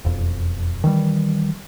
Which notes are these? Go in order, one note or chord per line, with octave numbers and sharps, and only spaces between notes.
E1 F2
D#3 E3 G3